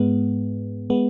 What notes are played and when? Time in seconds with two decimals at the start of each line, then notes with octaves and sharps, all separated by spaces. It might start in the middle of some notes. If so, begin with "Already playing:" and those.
Already playing: G#2 G#3 B3
0.90 G#3 B3